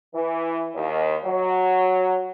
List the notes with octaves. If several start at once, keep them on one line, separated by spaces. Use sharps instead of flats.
E3
D#2
F#3